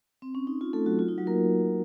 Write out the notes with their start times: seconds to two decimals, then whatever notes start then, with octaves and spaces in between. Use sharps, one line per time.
0.22 C4
0.35 C#4
0.47 D#4
0.61 F4
0.73 A3 A4
0.86 F#3 F#4
0.99 F4
1.09 D#4
1.18 F#3 F#4
1.27 A#3 A#4